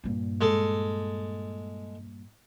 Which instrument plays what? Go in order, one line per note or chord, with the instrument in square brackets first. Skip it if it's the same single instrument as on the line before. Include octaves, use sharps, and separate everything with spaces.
[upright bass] G2 A#2
[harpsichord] G#3 A4 A5